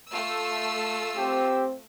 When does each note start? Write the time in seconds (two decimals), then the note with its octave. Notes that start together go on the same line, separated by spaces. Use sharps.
0.11 A3 F4 E6
1.17 C4 G4